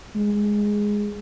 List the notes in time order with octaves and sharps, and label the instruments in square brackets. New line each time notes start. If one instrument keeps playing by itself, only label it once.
[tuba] G#3